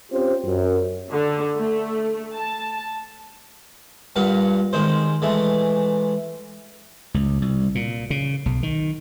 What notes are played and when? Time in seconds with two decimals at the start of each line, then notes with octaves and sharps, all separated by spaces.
0.12 C4 C#4 F4 G4 C5
0.46 F#2
1.11 D3
1.56 A3
2.35 A5
4.16 G2 A#2 F5 F#5
4.73 D#3 G#3 C5
5.22 E3 G#3 A3
7.14 C#2
7.42 C2
7.75 A#2
8.10 C#3
8.46 B1
8.63 D#3